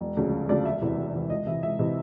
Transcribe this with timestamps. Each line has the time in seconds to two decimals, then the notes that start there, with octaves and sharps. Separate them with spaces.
0.01 E1
0.17 D2 C#3 F3
0.33 E1
0.49 D2 C#3 F3 D5
0.65 E1 E5
0.82 E2 C3 E3
0.98 E1
1.14 E2 C3 E3
1.30 C#2 D#5
1.46 C3 E3 E5
1.63 C#2 E5
1.79 C3 E3 D#5